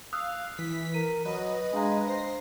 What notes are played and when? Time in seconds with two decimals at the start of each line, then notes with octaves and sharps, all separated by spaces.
0.13 F5 D#6 E6 F#6
0.58 E3 B6
0.94 A#4 D#7
1.25 F#3 B4 D#5
1.73 G#3 D4 F5 A#5
2.08 C5 A#6 C7